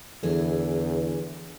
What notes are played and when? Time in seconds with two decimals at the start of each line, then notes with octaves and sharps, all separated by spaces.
0.23 E2 D3 E3 G#4